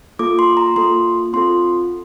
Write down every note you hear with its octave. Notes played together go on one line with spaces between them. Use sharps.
A#3 F4 A4 D6
C6
A#5
A#3 F4 A4 C6
C4 F4 A4 C6